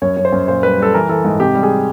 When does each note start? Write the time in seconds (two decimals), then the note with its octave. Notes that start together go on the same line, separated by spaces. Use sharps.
0.02 F#2 C#5
0.17 F#2 C#5
0.25 C5
0.32 F#2
0.48 A#2 C5
0.63 G3 B4
0.78 G3 A4
0.94 E3 A#4
1.09 E3 A4
1.24 G#2
1.40 C3 G4
1.55 G3
1.63 G#4